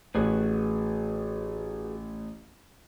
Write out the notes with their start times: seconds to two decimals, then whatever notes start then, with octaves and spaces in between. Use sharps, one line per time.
0.15 A1 F#4 G#4 B4